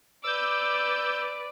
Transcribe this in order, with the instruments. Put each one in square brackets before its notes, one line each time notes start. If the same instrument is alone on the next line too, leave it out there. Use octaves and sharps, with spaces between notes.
[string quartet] B4 D5 [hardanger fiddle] D6 [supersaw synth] E6 G6